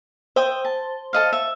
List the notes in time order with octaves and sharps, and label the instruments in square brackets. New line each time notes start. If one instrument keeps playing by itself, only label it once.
[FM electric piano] C5 [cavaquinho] E5 G5 D#6
[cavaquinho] A5
A4 D#5 F5
E5